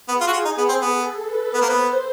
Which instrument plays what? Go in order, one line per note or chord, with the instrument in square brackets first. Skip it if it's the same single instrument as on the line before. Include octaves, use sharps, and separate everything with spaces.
[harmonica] B3 [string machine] G#4
[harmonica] F4
F#4
F4
D#4
B3
C4
[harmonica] B3 [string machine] A4
[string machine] B4
[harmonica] B3 [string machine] C5
[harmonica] A#3
B3